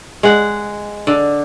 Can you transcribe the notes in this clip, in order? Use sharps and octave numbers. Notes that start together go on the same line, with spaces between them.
G#3 F#5
D3